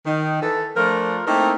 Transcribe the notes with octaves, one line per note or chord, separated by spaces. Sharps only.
D#3
E3 A4
F3 A3 D4 F4 A#4
A3 A#3 C4 D#4 E4 A#4